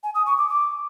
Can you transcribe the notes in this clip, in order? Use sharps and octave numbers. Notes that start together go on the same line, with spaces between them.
G#5
D#6
C#6
D6
D6